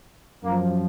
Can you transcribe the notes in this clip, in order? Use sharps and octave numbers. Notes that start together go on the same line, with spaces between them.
F#2 F3 A#3